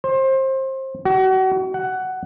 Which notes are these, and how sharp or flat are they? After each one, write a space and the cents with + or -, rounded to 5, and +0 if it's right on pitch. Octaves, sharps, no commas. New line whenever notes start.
C5 +25
F#4 +35
F#5 +10